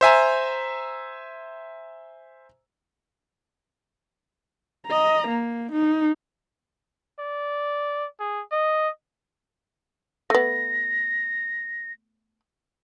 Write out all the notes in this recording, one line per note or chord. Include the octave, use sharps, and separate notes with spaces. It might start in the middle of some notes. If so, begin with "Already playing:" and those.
C5 E5 G#5 A#5
D#5 A#5
A#3
D#4
D5
G#4
D#5
A3 B3 A#6